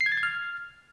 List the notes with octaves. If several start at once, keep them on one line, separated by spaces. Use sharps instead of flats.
C7
G#6
A6
G#6
F6